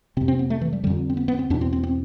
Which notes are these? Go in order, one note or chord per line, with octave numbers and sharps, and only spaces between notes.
F2 C3 C4
C4
B3
A3
E3
G3
F2 D3 G3
C4
B3
B3
C4
E2 B2 D4
C4
C4
C4